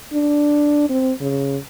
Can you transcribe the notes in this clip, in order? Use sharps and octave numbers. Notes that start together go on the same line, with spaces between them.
D4
C4
C#3